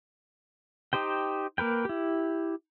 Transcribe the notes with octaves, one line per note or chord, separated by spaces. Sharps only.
D#4 G4 C5 G5
A#3 A#4 B4 G5
E4 G4